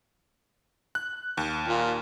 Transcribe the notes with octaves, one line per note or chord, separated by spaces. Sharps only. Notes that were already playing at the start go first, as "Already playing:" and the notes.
F#6
D#2
A#2